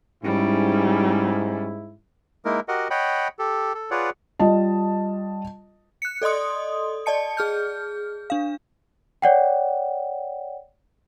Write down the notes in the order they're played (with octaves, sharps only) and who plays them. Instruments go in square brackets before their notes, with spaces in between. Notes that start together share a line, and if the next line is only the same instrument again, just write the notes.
[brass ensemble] G#2 E4 [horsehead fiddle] G3 C#4
[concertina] G#3 A#3 D#4 E4 A#4
F#4 G4 A#4 D#5 F#5
C#5 D#5 F#5 G5 B5
G4 A4
A4
F4 G#4 B4 C#5 D5 F#5
[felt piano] G3 F4 D#5 A5
[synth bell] F#6 C#7
A4 D5 D#5 C6 D#6
D5 D#5 A5 C#7
G#4 F6 G6
D4 F5
[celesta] C#5 D5 F#5 G5